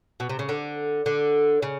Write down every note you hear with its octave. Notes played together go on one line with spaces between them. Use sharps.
B2
C3
C#3
D3
D3
C#3